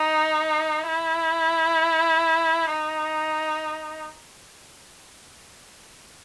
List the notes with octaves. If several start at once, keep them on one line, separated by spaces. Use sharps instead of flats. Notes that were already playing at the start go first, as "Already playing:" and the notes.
Already playing: D#4
E4
D#4